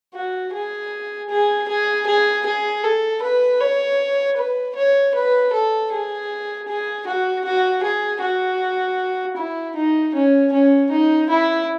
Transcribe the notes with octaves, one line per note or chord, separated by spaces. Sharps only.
F#4
G#4
G#4
G#4
G#4
G#4
A4
B4
C#5
B4
C#5
B4
A4
G#4
G#4
F#4
F#4
G#4
F#4
E4
D#4
C#4
C#4
D#4
E4